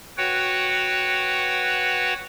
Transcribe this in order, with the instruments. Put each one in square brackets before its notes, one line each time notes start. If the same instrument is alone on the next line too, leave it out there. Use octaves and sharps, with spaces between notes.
[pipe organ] F#4 B4 C#5 F#5 G5